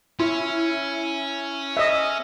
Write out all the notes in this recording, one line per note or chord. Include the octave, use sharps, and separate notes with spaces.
C#4 E4
D#5 E5